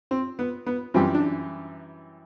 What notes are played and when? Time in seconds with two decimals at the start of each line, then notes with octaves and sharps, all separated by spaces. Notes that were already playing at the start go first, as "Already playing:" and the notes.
0.11 C4
0.39 B3
0.67 B3
0.94 F#2 E3 G3 C4
1.15 D4